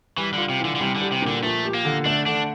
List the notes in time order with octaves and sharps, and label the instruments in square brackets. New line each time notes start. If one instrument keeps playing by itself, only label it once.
[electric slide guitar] E3 [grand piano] G3
[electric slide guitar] D3 [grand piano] F4
[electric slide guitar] C3
[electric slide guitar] D3 [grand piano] E3
[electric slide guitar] D3
[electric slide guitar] C3 [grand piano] G3
[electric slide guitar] D3
[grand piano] G4
[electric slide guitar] C3
[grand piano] A#2
[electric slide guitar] D3
[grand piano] F3 [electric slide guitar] A3
[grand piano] G4
[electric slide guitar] A#3
[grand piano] D3
[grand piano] A3 [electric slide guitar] D4
[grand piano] D3 [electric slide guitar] D4